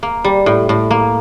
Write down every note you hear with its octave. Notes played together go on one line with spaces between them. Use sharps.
A#3
G3
A2
A2
A#3